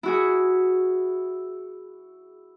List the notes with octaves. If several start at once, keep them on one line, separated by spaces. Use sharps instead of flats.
E4 F#4 G#4